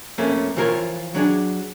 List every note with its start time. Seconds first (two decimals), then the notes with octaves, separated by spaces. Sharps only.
0.18 F2 A3 A#3 C#4
0.57 E3 F3 F4 A#4 C#5
1.15 F#3 D4 G#4